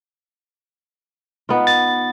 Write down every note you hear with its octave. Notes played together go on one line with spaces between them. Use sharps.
B3 D#4 F4
A6